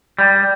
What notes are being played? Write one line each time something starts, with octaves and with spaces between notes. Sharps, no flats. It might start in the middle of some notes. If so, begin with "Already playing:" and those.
G3